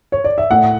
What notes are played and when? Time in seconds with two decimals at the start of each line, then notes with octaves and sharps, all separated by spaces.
0.12 C#5
0.24 D5
0.38 E5
0.51 A2 F#5